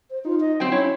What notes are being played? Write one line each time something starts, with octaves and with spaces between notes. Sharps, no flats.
C5
D#4 F4
D#5
F#3 C4 C5 G5
C#4 E4 C#5